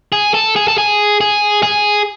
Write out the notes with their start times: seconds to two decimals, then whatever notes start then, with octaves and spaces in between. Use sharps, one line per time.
0.12 G#4
0.34 A4
0.56 G#4
0.68 A4
0.78 G#4
1.21 G#4
1.63 G#4